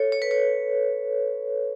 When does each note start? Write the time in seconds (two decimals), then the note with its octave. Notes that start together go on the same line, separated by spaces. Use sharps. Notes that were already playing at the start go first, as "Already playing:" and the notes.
Already playing: A4 C#5
0.12 C#5
0.22 B4
0.31 C#5